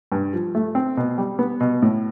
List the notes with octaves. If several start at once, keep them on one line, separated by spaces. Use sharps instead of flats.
G2
F3
A3
C4
B2
G3
B3
B2
A2